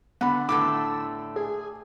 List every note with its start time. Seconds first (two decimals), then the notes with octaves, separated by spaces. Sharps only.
0.21 D3 B3 F#5 B5
0.49 A2 D3 A3 D6 E6
1.36 G#4